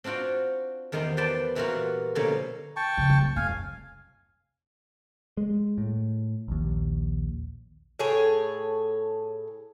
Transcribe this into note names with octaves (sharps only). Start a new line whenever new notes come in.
C4 D4 F4 F#4 G5
E2 D#3 G3 G4 C5 G5
B4 C5 D5 G5 A5 B5
A#2 E3 G3 A#3 F4 F#4
B2 D3 F3 A#3 C#5 G#5
G5 A5 C#6
C#3 F3
D#1
F1 F5 G#5
G#3
A2
A#1 D#2
A2 G#4 C#5